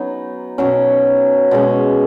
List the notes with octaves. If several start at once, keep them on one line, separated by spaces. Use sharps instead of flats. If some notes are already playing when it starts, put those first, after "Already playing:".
Already playing: F#3 B3 C#4 D#4
B2 F#3 C#4 F#4
B2 G#3 C#4